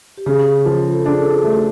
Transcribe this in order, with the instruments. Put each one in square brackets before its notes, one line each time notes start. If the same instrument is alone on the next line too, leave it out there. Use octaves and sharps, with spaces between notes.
[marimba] G4
[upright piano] C#3 [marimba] G#4
[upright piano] F3
[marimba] A4
[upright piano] D4 [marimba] G#4
[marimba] A4
G#4
[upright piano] A3
[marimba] F#4